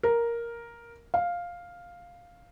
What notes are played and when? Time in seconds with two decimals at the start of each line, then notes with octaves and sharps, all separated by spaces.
0.03 A#4
1.14 F5